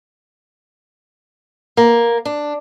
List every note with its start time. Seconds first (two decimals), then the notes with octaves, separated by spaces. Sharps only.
1.77 A#3
2.25 D4